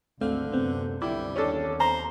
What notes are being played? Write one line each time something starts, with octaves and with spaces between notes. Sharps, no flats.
G#1 D2 D3 A3 C4 F5
F#2 C3 B3 C4
C2 D3 G3 E4
D#2 C#4 D4 A4
C5 A#5